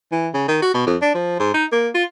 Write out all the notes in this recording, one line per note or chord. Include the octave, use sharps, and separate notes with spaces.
E3
C#3
D#3
F#4
B2
F2
D4
F3
G#2
D#4
A#3
F4